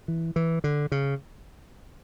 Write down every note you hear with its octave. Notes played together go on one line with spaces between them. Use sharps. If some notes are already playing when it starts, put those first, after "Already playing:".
E3
E3
D3
C#3